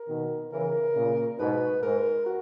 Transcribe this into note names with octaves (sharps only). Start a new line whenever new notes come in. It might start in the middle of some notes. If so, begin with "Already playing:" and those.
Already playing: A#4
B2 D#3
C#3 E3 A#4
A#2 C#3
G#2 B2 B4
G#2 A#4
F#4